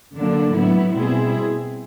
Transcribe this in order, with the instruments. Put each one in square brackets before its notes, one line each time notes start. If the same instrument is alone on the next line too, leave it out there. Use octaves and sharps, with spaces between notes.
[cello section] D3 F#3 A#3 D4
A2 F#3 B3 E4
B2 G3 C4 E4 G#4